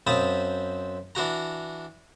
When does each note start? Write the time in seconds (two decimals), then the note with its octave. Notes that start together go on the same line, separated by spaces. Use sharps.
0.07 F#2 C4 F5 A5 B5 D#6
1.15 E3 D4 F#4 A#5